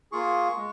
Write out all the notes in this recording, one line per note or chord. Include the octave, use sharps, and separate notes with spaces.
A#3 F4 G#4 C#6
G#3